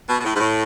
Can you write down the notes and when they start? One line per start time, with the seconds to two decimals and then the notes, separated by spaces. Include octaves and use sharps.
0.08 B2
0.20 B2
0.24 A2
0.35 G#2
0.40 A2